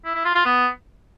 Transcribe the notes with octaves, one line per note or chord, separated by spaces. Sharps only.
E4
E4
F4
F4
B3